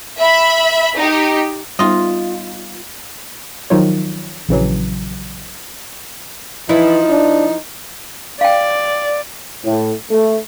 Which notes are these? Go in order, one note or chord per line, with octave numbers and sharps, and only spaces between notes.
E5 B5
D#4 G4
G3 B3 D#4 F4 D#5
D#3 F3 F#3 D#4 F4 C#5
A#1 C#3 E3 F#3
E3 F3 D#4 E4
D4
D5 F5 G5
A2
A3